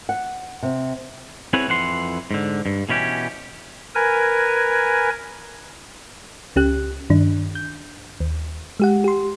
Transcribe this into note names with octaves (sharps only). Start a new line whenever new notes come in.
F#5
C3
C4 E4 G#4 B4 C#5 F#5
F2 E3 F#5 C6
G#2 D3
G2
B2 E3 C#4 G4
A#4 B4 G#5
C#2 C#4 G4 F#6
G2 D#3 D4
G6
D#2
G#3 G4 F#5
G4 C6